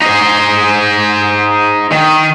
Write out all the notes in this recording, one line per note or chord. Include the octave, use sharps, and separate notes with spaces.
D#4 C5
D#3